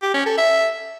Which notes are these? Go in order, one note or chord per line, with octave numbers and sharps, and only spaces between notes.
G4
C#4
A4
E5